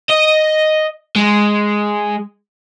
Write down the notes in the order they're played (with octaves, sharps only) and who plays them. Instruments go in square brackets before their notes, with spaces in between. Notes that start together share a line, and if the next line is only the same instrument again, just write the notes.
[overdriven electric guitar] D#5
G#3